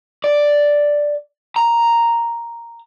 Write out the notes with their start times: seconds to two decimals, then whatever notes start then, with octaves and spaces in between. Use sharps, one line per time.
0.24 D5
1.56 A#5